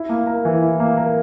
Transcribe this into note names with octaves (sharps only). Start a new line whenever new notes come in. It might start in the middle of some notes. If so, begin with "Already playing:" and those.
Already playing: E4
A#3
A#4
E3
E4
A#3
A#4